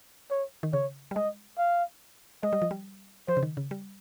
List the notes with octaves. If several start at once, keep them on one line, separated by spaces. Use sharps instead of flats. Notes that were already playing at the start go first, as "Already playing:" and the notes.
C#5
D#3
C#3 C#5
G3
G#3 D#5
F5
G#3 D#5
G3
F3
G3
F3 C5
C#3
D#3
C#3
G3